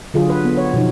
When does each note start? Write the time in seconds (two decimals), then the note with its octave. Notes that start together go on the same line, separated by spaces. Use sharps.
0.14 D3 F#3 F4 G#4
0.30 B4
0.45 B3
0.57 C#5
0.74 B2 F3 D#4